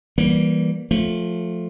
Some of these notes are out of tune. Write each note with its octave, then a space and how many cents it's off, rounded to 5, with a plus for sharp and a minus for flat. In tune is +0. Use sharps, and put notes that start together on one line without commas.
E3 +0 G3 +0 A#3 +20
F3 +10 A3 +0